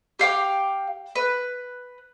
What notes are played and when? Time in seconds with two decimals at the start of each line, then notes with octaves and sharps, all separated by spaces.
0.19 G4 F5 G5 D6
1.15 B4